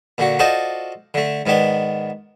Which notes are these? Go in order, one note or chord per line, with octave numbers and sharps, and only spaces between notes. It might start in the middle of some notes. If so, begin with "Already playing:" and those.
A#2 D3 F#4
F4 F#4 A4 C5 D5 D#5
D3 A3
G#2 D#3 B3 D4